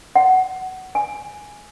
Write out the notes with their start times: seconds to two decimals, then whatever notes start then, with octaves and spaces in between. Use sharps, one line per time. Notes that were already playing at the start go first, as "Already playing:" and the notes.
0.16 F#5
0.95 G#5